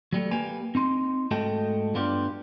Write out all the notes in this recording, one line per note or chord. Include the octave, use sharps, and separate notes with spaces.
F#3 G3 A3
A#3 G4 B4 G#5
C4 D#4 C6
G#2 A3 F#4 A4 D#5 G5
G2 B3 D4 F4 G4